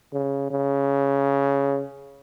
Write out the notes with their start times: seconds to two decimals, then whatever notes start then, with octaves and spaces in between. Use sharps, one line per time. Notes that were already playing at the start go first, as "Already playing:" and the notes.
0.13 C#3
0.51 C#3